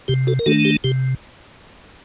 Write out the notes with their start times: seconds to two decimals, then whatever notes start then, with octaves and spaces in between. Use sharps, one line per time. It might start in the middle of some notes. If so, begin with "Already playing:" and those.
0.08 C3 G4
0.27 F#4 A4
0.39 A#4
0.46 D#3 A3 D4 F#4 A4
0.65 G4
0.84 C3 G4